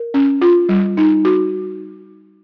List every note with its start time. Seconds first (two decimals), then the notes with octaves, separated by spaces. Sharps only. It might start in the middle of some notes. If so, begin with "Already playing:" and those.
Already playing: A#4
0.14 C#4
0.42 F4
0.69 G3
0.97 D#4
1.25 F#4